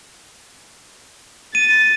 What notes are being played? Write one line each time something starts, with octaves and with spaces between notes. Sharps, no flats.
A6 D#7